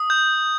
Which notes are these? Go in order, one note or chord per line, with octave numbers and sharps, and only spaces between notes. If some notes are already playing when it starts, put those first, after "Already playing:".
Already playing: D#6
G6